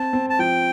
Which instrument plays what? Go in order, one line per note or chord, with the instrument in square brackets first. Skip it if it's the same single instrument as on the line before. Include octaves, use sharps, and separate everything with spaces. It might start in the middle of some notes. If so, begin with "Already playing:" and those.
Already playing: [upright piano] C4 [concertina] A5
[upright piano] C4
[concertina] A5
[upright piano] F3 [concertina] G5